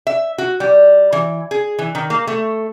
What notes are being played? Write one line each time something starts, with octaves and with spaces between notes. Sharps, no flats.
E5
F#4
G3
E3
G#4
E3
D#3
A#3
A3